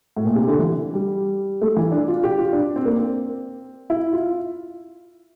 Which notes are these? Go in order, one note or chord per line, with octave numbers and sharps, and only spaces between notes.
A2
A#2
C3
D3
E3
G3
A3
E3
D4
F4
G4
F4
D4
C4
A#3
C4
E4
F4